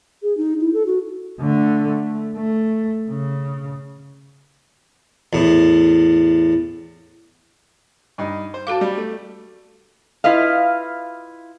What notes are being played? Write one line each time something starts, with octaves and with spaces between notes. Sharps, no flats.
G#4
D#4
E4
A4
F#4
D3 A3
A3
A3
C#3
E2 A2
G2 D#4
C5
F#4 A4 F5 A5 D6
G3
A3
E4 F4 B4 D#5 F5